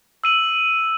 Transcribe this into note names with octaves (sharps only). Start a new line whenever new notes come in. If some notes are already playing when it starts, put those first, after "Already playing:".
E6 D#7 F#7